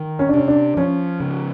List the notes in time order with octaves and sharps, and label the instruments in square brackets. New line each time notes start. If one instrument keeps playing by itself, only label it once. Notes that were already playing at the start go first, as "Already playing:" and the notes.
Already playing: [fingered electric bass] D#3
[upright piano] C#4
D4
[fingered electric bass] C3 [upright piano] C#4
[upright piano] D4
[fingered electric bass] F3 [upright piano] C#4
[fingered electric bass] C#3